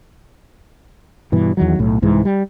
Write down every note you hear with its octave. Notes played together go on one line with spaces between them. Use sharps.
G2 B2 E3
E2 D#3 F#3
B1 A2
C2 G#2 E3 G#3
G3